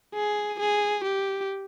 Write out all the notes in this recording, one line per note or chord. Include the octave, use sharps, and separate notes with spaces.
G#4
G#4
G4